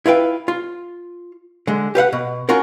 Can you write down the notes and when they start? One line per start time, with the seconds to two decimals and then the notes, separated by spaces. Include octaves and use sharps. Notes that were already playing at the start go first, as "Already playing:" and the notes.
0.06 E4 F4 B4 G5
0.48 F4
1.67 D3 G#3
1.95 G4 B4 F5 F#5
2.13 B2
2.49 C#4 F4 F#4 A#4